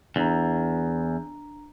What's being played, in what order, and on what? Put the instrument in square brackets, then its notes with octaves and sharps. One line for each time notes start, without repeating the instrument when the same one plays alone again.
[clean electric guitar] E2 [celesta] D4 A#5